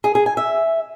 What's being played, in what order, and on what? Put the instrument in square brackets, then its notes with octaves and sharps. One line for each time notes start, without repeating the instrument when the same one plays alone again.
[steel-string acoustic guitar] G#4
G#4
G#5
E5